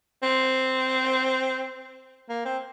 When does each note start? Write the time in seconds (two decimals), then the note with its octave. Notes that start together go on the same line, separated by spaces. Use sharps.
0.23 C4
2.29 A#3
2.45 C4